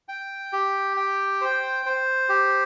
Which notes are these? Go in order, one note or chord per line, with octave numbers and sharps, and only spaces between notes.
G5
G4
G5
C5
C5
G4